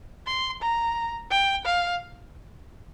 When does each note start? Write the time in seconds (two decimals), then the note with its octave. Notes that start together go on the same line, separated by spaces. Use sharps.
0.27 C6
0.62 A#5
1.31 G5
1.65 F5